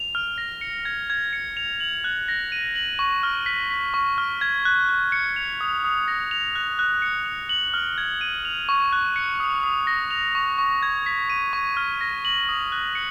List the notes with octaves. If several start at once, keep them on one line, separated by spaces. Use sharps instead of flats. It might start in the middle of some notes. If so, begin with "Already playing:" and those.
Already playing: F7
F6
A#6
C#7
G#6
G#6
C#7
F7
F#7
F#6
A#6
D#7
F#7
C#6
F6
B6
B6
C#6
F6
G#6
F#6
F#6
C#7
F7
D#6
D#6
A#6
F7
F#6
F#6
C#7
F7
F#7
F6
G#6
D#7
F7
C#6
F#6
C#7
D#6
D#6
A#6
F7
C#6
C#6
G#6
B6
D#7
C#6
F6
A#6
F#7
D#6
F#6
C#7